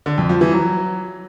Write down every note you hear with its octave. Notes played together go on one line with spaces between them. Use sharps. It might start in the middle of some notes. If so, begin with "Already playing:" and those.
D3
F2
F3
E3
F#3